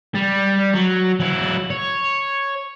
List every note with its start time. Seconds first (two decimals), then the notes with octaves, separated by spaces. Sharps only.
0.15 G3
0.74 F#3
1.20 F#3 E4
1.70 C#5